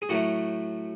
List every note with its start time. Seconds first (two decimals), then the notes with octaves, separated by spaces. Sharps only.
0.02 G#4
0.09 A2 F#3 A3 F#4